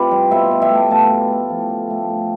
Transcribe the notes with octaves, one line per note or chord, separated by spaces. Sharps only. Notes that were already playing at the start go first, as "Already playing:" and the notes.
Already playing: C3 F4 G4 B4 D5
G3
B2 C5 E5
B2
E5 G5
A3
B2 F5 A5
B2
A3
F3
D3
A3
D3